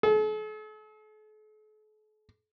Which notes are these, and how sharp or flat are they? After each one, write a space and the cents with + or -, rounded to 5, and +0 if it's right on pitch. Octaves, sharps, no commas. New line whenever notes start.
A4 -45